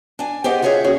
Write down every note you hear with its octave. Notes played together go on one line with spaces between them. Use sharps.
D4 G#5
G4 G#4 C5 D5 D#5 F#5
F4 F#4 G#4 C#5 D#5 E5
D#2 C#4 F#4 G#4 C#5